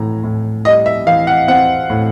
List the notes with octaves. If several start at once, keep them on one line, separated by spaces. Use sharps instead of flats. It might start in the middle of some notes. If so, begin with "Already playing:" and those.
Already playing: A2 E3 A#5
A2
G3 D#5
E5
E3 F5
F#5
C4 F#5
A2